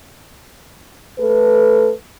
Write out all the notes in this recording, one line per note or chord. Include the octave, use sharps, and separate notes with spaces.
A3 A4 B4